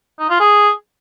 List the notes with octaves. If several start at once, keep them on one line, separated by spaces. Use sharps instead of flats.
D#4
F4
G#4